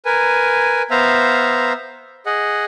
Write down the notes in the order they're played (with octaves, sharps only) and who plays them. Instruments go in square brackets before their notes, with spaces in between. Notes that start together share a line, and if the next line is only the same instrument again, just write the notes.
[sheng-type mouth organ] A#4 B4 G#5
B3 C5 E5 F5 A#5
G#4 D#5 F#5